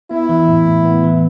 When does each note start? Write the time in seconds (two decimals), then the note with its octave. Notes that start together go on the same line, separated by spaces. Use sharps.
0.11 B3 E4
0.29 E3
0.48 A2
0.67 A2
0.85 B3
1.04 E3